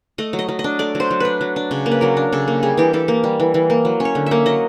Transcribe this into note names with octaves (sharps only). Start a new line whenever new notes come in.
A3 D#5
F#3
D#5
F#3
D#5
D4
A3 D5
F#3
C5
F#3
D4 B4
F#3
D4
C#3
A#3
B4
F#3 A#4
D4
C#3 A4
A#3
G3 G#4
E3 G4
E3 A4
A#3
G3
E3
E3
A#3
F#3
C#4
C#5
D3
A#3 E5
F#3 D#5